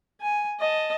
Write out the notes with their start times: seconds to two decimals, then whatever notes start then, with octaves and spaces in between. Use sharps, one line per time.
0.21 G#5
0.60 D#5 A5